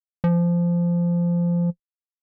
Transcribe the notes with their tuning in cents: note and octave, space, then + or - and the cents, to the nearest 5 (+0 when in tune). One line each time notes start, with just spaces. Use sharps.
F3 -15